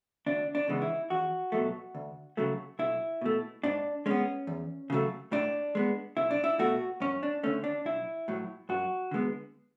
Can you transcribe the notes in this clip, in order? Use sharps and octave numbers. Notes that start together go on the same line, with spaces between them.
D2 D4
D4
C#3 E3 G#3 B3
E4
E2 F#4
B2 F#3 A3
D2
C#3 F#3 A3
B1 E4
B2 A3
G#2 D4
G#3 B3 C#4
E2
C#3 F#3 A3
A2 D4
G#3 B3
B1 E4
D4
E4
B2 A3 F#4
F#2 C#4
D4
D3 A3 C#4
D4
B1 E4
A2 F#3
F#2 F#4
D3 G#3 B3